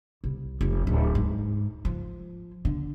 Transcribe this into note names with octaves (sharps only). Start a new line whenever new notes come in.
C2
F1
D1
G#2
F3
D3